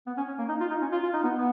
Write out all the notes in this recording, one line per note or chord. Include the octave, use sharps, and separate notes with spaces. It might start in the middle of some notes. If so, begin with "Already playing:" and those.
B3
C#4
C#4
A#3
D#4
F4
D#4
C#4
F4
F4
D#4
B3
B3